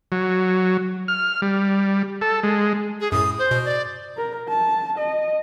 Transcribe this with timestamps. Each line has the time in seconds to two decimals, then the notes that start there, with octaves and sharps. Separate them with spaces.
0.12 F#3
1.08 F6
1.42 G3
2.21 A4
2.43 G#3
3.00 G#4
3.12 F#2 A2 D#6
3.39 C5
3.51 B2
3.65 D5
4.17 A#4
4.49 A5
4.98 D#5